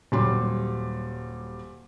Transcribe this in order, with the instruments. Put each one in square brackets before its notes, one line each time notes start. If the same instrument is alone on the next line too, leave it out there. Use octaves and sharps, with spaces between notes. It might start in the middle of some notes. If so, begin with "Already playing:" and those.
[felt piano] D#1 F#3 G3 C6